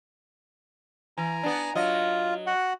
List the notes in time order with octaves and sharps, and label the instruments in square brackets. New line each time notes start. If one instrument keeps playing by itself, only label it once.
[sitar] E3 [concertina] G#5 A#5
[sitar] B3 D4
[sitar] F#3 D#5 [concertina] F4
[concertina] F#4 F#5